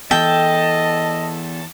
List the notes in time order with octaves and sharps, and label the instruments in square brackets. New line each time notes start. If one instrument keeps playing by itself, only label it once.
[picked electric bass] E3 B3 [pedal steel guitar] A4 [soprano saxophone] D#5 [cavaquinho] G5